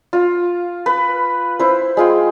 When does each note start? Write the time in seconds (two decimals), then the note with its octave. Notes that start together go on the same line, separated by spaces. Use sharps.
0.13 F4
0.86 B4
1.59 E4 C5
1.97 G#3 F4 G5